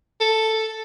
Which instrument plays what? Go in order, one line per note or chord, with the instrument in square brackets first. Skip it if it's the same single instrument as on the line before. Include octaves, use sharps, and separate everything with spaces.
[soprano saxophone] A4